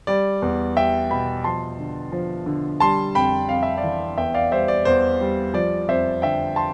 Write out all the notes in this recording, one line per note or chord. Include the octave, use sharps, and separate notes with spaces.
G3 D5
E2
G3 E5 G5
B2 G5 B5
F3 A5 C6
D3
F3
D3
G3 A5 C6
F2 G5 B5
F2 F5
E5
D5 F5
E3
E2 E5 G5
D5 F5
G3 C5 E5
D5
E2 C5
G3
F3 D5
F2 C5 E5
D3 E5 G5
A5 C6